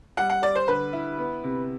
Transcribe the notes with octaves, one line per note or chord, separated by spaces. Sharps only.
G3 F#5
F#5
G3 D5
C5
D3 B4
E4
B3
C3